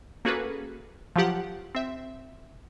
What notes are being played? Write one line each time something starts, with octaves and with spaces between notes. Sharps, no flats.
A#3 C#4 F#4 G#4 A4 B4
F3 F#3 F4 G4 F#5
C4 E5